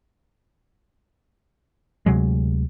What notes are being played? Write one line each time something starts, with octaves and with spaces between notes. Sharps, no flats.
D2 C3 F#3 G#3